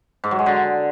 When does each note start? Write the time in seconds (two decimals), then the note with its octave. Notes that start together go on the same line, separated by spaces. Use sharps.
0.24 G#2
0.31 F#3
0.39 G#3
0.46 D3